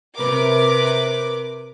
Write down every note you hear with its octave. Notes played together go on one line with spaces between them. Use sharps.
C3 A#4 B4 D6